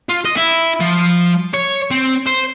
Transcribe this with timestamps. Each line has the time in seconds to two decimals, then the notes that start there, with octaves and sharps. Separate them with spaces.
0.09 F4
0.25 D#5
0.37 E4
0.80 F3
1.54 C#5
1.91 C4
2.26 C5